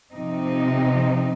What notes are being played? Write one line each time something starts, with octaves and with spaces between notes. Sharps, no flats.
C3 F3 C4 D#4